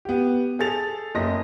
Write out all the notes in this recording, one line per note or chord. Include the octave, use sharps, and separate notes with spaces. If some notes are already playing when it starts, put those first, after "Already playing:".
B3 G4
G#4 A4 A6 F7
F#1 D#5 A#6